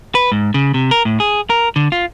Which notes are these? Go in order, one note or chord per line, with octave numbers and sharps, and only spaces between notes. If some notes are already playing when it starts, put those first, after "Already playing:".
B4
G#2
C#3
C3
A#4
A2
G#4
A#4
D3
F4